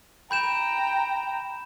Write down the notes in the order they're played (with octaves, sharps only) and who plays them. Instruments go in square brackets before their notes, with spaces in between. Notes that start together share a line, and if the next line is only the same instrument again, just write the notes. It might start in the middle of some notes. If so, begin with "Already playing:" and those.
[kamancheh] G5 A#5 [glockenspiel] B5 G6 E7